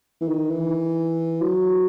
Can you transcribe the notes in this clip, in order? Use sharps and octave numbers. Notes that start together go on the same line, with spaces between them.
E3
D#3
E3
F#3